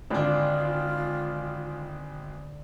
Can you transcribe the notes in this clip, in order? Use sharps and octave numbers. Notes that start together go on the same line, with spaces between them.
G#1 D3 D4 F4